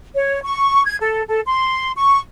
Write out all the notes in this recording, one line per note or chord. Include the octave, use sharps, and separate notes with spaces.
C#5
C#6
G#6
A4
A4
C6
C#6